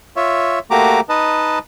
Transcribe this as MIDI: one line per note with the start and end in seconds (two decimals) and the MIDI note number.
0.16 0.59 65
0.16 0.59 73
0.16 0.59 76
0.71 1.00 57
0.71 1.00 58
0.71 1.00 66
0.71 1.00 67
0.71 1.00 82
0.71 1.00 86
1.09 1.59 63
1.09 1.59 71
1.09 1.59 75
1.09 1.59 81